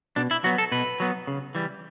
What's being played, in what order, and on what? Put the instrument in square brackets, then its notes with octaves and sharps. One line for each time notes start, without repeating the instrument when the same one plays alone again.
[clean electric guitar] B2 D4
E4
F#3 B3 F#4
A4
B2 B4
F#3 B3
C#3
E3 G3